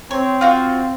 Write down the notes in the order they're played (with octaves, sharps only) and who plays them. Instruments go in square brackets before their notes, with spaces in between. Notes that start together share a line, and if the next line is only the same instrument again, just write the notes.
[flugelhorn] C4 [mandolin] C#5
[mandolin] F4 F#4 G5